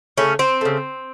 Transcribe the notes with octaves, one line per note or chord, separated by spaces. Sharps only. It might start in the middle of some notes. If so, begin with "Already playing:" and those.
C#3 A3 C#4
C4
C#3 A3